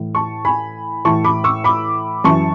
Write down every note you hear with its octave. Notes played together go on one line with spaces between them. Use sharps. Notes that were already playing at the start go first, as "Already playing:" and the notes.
Already playing: A2 E3
A5 C#6
G#5 B5
A2 E3 A5 C#6
B5 D6
C#6 E6
B5 D6
F#2 E3 A5 C#6